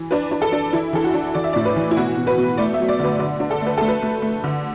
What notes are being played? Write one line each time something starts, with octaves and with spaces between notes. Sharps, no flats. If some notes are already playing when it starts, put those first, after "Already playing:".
Already playing: E3
D4 B4
D4
A4
D4
E3 E4
E3 A4
F#4
D4
E3 D5
E5
D5
A2
B4
E3
E4
B2 F#4
B2
B4
B2
A3 D5
E5
F#3
D5
D3 B4
D3 D5
D4
A4
A3 B4
A3 A4
B4
A3
A3
D3